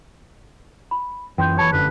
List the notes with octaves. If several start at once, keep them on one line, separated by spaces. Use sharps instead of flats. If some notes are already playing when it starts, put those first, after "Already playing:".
B5
F#2 E3 G5 C6 G6
F#1 E3 C#5 A5 B5
F1 F#2 D3 B4